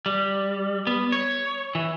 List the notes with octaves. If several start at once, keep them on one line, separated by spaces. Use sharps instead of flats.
G3
B3
C#5
E3